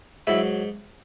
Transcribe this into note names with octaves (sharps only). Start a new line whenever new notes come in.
G#2 F#3 E4 E5